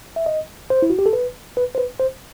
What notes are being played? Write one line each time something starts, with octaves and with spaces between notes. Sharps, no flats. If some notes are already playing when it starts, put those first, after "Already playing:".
E5
D#5
C5
E4
F#4
G4
A4
B4
B4
C5
B4
C5